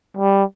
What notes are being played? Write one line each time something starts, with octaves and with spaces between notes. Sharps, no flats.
G3